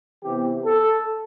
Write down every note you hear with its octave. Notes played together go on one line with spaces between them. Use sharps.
C3 E3 B3 G4
A4